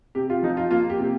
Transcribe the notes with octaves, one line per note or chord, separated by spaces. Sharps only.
C3 G4
F4
F3 D#4
F4
A#3 F4
G4
C3